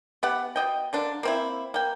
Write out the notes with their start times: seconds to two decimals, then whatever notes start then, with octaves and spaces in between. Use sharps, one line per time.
0.23 B3 G4 F#5
0.56 B2 D#5 G5
0.93 D3 A#3 D4
1.23 A#3 C4 E4
1.74 A#3 G5